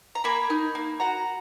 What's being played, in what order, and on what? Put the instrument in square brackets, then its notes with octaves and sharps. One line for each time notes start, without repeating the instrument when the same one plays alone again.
[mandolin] A#5
A#3 G#5 B5
D#4
A#3
F#4 F#5 A#5